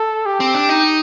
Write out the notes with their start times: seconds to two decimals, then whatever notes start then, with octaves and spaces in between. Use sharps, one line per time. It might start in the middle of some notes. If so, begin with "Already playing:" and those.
Already playing: A4
0.26 G4
0.40 C4
0.54 D4
0.69 D#4